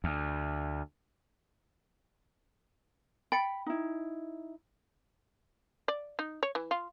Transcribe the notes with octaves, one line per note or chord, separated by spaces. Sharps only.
D2
G5 B5 A6 C#7
D#4 E4
D5
D#4
C#5
E3
F4